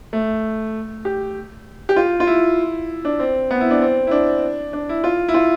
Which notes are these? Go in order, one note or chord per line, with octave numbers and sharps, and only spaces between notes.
A3
G4
G4
F4
F4
E4
D4
C4
B3
E4
D4
C4
E4
D4
D4
E4
F4
E4
F4